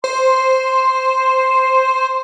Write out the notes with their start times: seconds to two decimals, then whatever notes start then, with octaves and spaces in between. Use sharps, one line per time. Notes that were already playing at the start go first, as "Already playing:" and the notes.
0.04 C5 C6